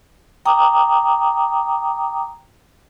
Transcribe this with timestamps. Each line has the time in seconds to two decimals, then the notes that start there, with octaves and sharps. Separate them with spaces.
0.45 G5 A#5 D6 D#6